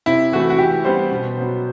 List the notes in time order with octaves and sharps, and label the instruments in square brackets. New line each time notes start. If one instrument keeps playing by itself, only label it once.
[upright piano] C3 E4
E3 A3 F#4
F#4
E3 G4
G3 B3 C5
B2
F#3 B3